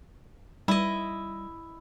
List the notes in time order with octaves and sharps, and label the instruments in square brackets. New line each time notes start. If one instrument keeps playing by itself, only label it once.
[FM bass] G3 [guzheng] E4 D#5